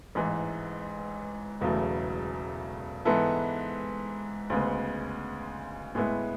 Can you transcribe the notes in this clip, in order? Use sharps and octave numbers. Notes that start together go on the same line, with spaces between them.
A1 G#2 E3
E1 E2 C#3 F#3 A3
G#2 E3 B3 E4 A4
D2 C#3 G#3 B3
A2 G#3 B3 E4